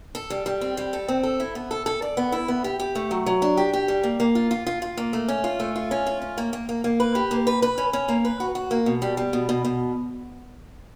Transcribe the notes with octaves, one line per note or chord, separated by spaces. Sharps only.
A4
G3
G3
C4
G3
A4
C4
A4
E4
B3
A4
A4
D5
B3
E4
B3
G4
G4
A3
F#3
F#3
D4
G4
G4
G3
A#3
A#3
F4
F4
F4
F4
A#3
A3
C#4
F4
A3
F4
C#4
F4
C#4
A#3
A#3
A#3
A#3
B4
G4
A#3
B4
B4
C#4
C#4
A#3
B4
F#4
F#4
A#3
B2
G3
G3
B2
B2
B2